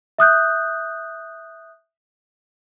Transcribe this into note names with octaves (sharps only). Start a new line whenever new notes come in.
E5 D#6 F#6 G6